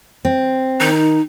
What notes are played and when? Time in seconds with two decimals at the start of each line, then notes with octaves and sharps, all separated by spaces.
0.25 C4
0.80 D#3 D#4